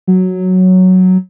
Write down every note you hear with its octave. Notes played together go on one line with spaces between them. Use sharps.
F#3